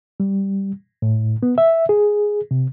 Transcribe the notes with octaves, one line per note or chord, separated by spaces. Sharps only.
G3
A2
B3
E5
G#4
C3